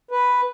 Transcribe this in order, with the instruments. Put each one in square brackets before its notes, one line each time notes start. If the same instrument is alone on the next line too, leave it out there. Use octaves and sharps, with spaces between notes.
[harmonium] B4